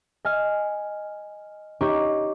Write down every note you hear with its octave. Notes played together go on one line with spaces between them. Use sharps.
D#5 G#5 F6
D#4 G4 C#5 D#5 C#6 D6